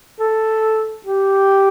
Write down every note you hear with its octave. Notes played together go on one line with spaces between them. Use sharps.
A4
G4